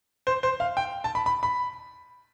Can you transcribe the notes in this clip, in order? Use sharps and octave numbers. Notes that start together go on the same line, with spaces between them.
C5
C5
F5
G5
A5
B5
B5
B5